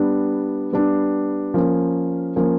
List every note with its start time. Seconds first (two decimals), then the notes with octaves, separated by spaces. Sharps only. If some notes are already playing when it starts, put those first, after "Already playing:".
Already playing: G3 B3 D4
0.73 G3 B3 D4
1.54 F3 A#3 C#4
2.36 F3 A#3 C#4